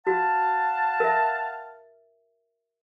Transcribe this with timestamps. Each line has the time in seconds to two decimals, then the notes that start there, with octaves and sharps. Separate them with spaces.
0.07 F#4 F5 F#5 A5
1.00 A#4 E5